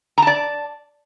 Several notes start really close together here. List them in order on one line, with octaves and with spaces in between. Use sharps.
A#5 A5 D5